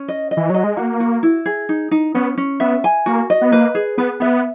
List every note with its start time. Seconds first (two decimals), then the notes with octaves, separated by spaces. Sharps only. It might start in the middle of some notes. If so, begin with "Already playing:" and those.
Already playing: C#4
0.08 D#5
0.31 D#5
0.37 E3
0.50 F#3 D#5
0.64 G#3
0.77 A#3 F#4
1.00 F#4
1.23 E4
1.46 G#4
1.69 D#4
1.91 D#4
2.14 B3 C#4
2.38 C#4
2.60 B3 E5
2.84 G#5
3.06 A#3 F#4
3.30 D#5
3.41 B3
3.52 A#3 B4
3.75 G#4
3.98 B3 B4
4.20 B3 E5